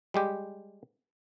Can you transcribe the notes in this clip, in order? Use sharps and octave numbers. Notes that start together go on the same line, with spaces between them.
G3 G#3 G4